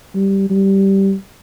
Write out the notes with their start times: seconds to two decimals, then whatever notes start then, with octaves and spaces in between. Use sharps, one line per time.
0.15 G3
0.50 G3